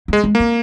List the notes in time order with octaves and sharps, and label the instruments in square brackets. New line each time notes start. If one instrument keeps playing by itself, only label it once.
[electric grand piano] G#3 [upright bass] A#3
[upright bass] G#3
[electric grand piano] A#3
[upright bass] C4